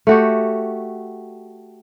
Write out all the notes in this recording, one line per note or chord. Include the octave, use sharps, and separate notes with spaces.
A3 F#4 G4